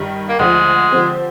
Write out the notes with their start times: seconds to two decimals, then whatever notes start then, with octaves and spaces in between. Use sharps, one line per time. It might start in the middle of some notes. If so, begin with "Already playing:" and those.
Already playing: G2 D#3 G3
0.29 A#3
0.39 D2 D3 F3 G#3
0.91 D3 F3 C4 G4